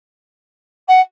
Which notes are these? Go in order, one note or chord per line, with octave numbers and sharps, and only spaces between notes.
F#5